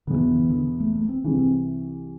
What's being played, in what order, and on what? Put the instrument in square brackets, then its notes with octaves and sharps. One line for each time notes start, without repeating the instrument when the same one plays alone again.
[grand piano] E2 B2 B3 [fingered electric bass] D3
[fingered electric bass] E3
D3
E3
D3
A3
A3
C4
[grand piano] C2 C3 E3 G#3 [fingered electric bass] D4
[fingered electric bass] C4